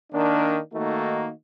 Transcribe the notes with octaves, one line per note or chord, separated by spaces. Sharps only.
D#3 A#3 D4
D#3 A3 A#3 D#4 F#4